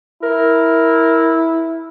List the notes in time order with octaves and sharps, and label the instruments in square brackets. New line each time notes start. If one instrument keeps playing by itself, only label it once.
[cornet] E4 [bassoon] A#4